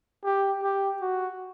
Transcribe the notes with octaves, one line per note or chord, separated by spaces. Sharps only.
G4
G4
F#4